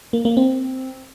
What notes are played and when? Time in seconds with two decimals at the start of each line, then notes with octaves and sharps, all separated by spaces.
0.13 A#3
0.25 A#3
0.37 C4